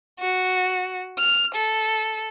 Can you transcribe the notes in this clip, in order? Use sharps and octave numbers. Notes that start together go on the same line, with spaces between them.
F#4
F6
A4